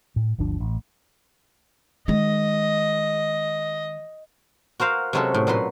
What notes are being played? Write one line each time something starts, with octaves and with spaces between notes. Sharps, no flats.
A2
G1 D2 F3 D4
A1
D#3 G#3 D#5
F#4 A#4 C5 F5
C3 F#3 G#3 C#4 F#4 A4
A2
A#2 F#3 B4 C6